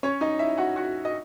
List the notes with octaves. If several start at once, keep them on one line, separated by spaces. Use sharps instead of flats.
C#4 C#5
D#4 D#5
E4 E5
F#4 F#5
F#4 F#5
D#5